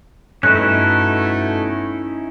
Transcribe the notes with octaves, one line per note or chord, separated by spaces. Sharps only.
G2 B2 A3 C#4 D#4 E4 F#6